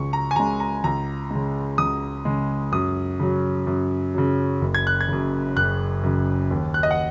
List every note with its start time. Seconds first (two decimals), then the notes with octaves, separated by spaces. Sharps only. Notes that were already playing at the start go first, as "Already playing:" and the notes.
Already playing: C#2 C#3 G#3 C#6
0.13 A#5
0.31 G#5
0.36 C#3 G#3 A#5
0.60 A#5
0.84 C#2 A#5
1.31 C#3 G#3
1.78 C#2 D#6
2.25 C#3 G#3
2.72 F#2 D#6
3.20 C#3 F#3
3.67 F#2
4.14 C#3 F#3
4.61 F#1
4.75 G#6
4.87 F#6
5.01 G#6
5.08 F#2 C#3
5.56 F#1 F#6
6.03 F#2 C#3
6.50 D#2
6.74 F#6
6.83 D#5
6.91 F#5